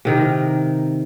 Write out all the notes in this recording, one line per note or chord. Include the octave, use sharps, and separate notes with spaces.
C3 D#3 A#4